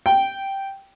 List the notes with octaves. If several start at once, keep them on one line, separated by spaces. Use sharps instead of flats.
G5